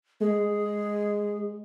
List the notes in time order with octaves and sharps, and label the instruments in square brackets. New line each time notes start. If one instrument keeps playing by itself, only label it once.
[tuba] G#3 [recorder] G#4